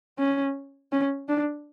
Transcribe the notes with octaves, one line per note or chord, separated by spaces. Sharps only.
C#4
C#4
D4